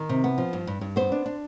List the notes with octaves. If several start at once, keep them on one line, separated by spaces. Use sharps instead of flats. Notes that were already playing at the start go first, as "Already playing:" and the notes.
Already playing: D#3
C3
B3
F3
G2
G2
G2
B3 C5
D4
D4